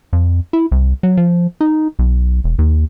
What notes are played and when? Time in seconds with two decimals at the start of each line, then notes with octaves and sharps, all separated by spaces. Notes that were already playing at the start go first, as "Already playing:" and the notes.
0.13 F2
0.53 E4
0.72 C2
1.03 F#3
1.17 F3
1.61 D#4
1.99 B1
2.44 E1
2.59 D#2